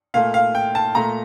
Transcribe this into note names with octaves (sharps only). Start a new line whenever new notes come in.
A#2 A3 F5
F5
G5
A5
A#2 A3 A#5